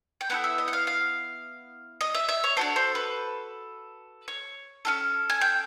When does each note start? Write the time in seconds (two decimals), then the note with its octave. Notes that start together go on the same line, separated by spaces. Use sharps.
0.21 G5
0.30 B3 E4 A4 F#5
0.44 E5
0.58 D#5
0.68 F#5
0.73 F5
0.87 F5
2.01 D#5
2.15 E5
2.29 E5
2.44 C#5
2.57 D4 F#4 A4 C5
2.76 C5
2.95 B4
4.28 C#5
4.85 C#4 F4 A4
5.30 G#5
5.41 G5